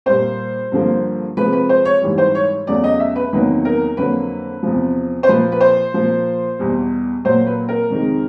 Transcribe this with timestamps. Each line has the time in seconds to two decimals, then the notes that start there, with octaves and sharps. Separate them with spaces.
0.06 A#2 G3 A#3 C5
0.72 G2 D3 F3 A#3
1.37 C3 F3 G#3 B4
1.53 B4
1.69 C5
1.85 C#5
2.02 G#2 E3 G3
2.18 C5
2.35 C#5
2.67 E2 C#3 F#3 A3 D5
2.84 D#5
3.00 E5
3.16 B4
3.33 E2 C3 D#3 F#3 A#3 B4
3.65 A#4
3.97 F2 D3 F#3 A#3 B4
4.63 E2 C3 F3
5.23 C5
5.28 A#2 F3 A#3 B4
5.52 B4
5.61 C5
5.94 A#2 F3 A#3
6.59 E2 B2 G3
7.25 A#2 F#3 A#3 C5
7.47 B4
7.69 A#4
7.90 F2 C3 D#3 G#3